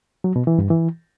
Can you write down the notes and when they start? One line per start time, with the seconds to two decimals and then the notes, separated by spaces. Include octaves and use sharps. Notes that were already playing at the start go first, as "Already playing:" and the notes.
0.24 F#3
0.36 B2
0.47 E3
0.59 G2
0.70 E3